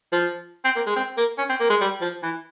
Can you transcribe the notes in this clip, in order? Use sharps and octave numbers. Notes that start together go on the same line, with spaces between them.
F3
C4
A#3
G#3
C4
A#3
C#4
C4
A#3
G#3
G3
F3
E3